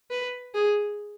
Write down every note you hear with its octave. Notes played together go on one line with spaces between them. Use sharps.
B4
G#4